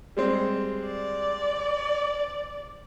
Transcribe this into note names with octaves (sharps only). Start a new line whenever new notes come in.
G3 G#3 C4
D5